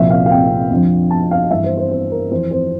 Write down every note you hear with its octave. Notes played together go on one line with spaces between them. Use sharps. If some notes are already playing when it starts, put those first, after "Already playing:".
Already playing: C2 A#2 F3 E5
F5
F5
G5
F2 D3 F3
A5
F5
G2 E3 E5
C5
C5
C5
A#4
F2 E3 C5
C5